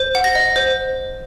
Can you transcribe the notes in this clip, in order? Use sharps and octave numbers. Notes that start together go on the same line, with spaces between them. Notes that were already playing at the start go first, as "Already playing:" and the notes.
Already playing: C5
F#5
A#6
D#5
C5